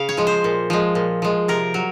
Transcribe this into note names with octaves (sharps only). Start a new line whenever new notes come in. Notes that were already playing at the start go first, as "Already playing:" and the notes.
Already playing: C#3 F5
C#5
F3 G#3
C5
A#2
F3 G#3
A#2
F3 G#3
C3 A#4
F#3